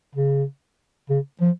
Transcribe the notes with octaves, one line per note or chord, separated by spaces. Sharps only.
C#3
C#3
F3